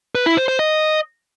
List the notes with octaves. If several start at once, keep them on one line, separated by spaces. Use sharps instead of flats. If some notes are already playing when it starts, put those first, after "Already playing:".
B4
E4
C5
C5
D#5